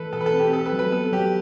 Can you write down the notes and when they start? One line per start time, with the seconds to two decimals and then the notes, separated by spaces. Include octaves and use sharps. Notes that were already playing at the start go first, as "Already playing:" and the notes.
Already playing: E3 A4 B4
0.13 B2 A4
0.21 B4
0.26 A4
0.33 C4
0.39 G4
0.53 C4 A4
0.65 B4
0.72 F#3
0.79 B4
0.92 B3 A4
1.12 F#3 G4